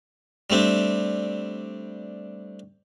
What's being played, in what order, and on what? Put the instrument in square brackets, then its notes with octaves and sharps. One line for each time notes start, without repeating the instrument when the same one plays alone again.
[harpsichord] G3 A3 C4 D4